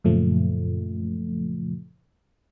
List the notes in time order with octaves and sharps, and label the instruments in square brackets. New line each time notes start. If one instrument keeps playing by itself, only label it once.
[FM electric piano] F#2 A#2 C#3 F3 A3